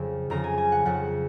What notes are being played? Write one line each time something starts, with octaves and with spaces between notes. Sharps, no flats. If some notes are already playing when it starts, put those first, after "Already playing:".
Already playing: F2 C#3 F3 G#5
F2 C#3 F3 A#5
G#5
G#5
F#5
F2 C#3 F3 F#5